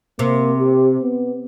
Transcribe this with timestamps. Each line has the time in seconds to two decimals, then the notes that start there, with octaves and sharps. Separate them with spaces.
0.19 C3 A#3
0.59 G4
1.02 B3